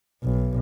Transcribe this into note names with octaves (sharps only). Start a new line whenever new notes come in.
B1